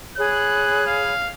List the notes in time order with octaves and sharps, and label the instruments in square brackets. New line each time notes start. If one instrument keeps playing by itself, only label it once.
[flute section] G#4 C#5 B5 [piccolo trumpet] F#6
[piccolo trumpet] F5